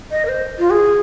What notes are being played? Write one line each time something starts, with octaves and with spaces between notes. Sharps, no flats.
D#5
A#4
C5
F4
G#4